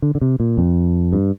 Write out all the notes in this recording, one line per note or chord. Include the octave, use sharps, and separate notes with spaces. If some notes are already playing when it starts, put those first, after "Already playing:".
D3
D3
C3
A#2
F2
G2